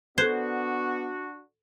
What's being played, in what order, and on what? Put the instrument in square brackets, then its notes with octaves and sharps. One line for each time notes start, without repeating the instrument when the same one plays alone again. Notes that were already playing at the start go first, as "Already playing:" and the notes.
[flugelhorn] B3 [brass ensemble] D4 F#4 [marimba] A4 F#6 G#6 [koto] C5